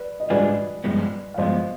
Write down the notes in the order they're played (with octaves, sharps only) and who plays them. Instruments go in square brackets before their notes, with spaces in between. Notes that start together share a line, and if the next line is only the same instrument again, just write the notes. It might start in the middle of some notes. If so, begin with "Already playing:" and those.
Already playing: [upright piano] B4 D5
D#5
[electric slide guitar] G#2 G3 D4 F4 G#4 [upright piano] B4 D5
[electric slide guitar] G2 F3 G#3 B3
[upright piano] F5
[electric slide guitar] G2 F3 G#3 B3 [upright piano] C5 D#5